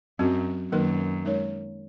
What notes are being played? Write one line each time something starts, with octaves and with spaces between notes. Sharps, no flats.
F#2 F#3 C4 F#4
F#2 D#3 F#3 A#3 D#4 A#4
G#3 D#4 A#4 C#5